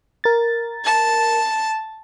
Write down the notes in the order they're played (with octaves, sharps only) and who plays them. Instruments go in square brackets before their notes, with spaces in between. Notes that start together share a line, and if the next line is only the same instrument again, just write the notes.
[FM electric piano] A#4 A6
[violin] A5